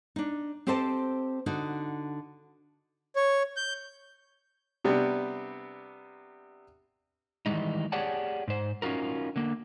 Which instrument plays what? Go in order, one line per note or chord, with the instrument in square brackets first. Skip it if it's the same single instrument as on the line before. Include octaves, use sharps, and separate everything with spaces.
[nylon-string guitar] D4 D#4
C4 G4 A4 C5 D#5 A5
D3 D#4 F#4
[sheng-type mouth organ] C#5
G6
[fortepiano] C3 G3 B3 D4
[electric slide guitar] D#3 E3 G3 G#3 D#4
G4 G#4 C#5 D5 F#5 A5
G#2 C5
C#4 D#4 F4 F#4 A#4
D3 A#3